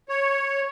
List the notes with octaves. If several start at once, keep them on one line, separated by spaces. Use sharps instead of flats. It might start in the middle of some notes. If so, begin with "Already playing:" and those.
C#5